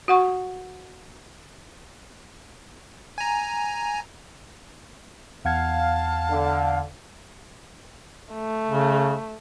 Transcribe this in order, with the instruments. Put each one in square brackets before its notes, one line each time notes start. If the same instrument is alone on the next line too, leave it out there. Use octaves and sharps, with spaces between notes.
[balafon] F#4 F#5 C#6
[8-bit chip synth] G#5 A#5
[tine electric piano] E2 F#5 G#6 [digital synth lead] F5 [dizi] A5
[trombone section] D3
[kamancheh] A3
[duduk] C#3